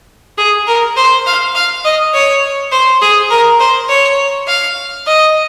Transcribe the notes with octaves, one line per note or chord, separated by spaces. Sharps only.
G#4
A#4
C5
F5
F5
D#5
C#5
C5
G#4
A#4
C5
C#5
F5
D#5